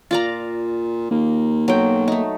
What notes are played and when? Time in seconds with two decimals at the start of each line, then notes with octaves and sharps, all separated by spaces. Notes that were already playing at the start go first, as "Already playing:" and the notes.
0.11 A#2 F4 D5 A#5
1.11 D#2 A#3
1.68 B1 F#3 G5
2.08 A3 D#4